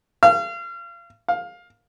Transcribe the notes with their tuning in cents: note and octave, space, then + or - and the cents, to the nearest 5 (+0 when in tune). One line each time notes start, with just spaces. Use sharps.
F5 -35
F5 +15